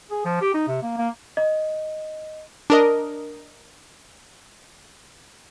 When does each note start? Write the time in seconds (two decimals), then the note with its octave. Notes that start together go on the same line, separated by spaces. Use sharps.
0.11 G#4
0.25 F3
0.41 G4
0.54 D#4
0.68 C3
0.82 A#3
0.97 A#3
1.37 D#5
2.70 D4 A#4 D#5